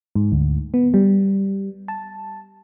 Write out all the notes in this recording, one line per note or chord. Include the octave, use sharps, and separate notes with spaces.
G#2
D2
B3
G3
A5